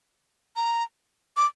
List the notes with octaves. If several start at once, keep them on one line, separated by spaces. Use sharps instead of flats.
A#5
D6